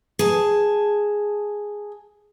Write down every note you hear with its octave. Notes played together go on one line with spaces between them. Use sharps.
G#4 A5